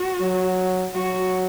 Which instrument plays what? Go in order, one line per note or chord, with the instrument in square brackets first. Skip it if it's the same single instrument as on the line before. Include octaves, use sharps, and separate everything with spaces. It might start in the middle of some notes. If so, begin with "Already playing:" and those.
Already playing: [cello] F#4
[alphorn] F#3
[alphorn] F#3 [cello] F#4